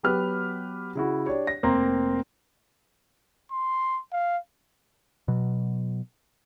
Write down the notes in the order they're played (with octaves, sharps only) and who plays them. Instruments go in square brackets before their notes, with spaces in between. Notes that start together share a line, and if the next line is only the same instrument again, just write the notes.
[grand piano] F#3 B3 G4 B4 F6
C#3 E4 F#4
D4 G4 C#5
A#6
F1 A#3 C4 A#5 C6
[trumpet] C6
F5
[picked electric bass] B2 F#3